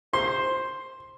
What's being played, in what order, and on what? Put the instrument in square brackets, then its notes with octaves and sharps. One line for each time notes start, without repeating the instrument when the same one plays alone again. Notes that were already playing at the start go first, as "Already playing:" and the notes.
[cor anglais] C5 [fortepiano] C6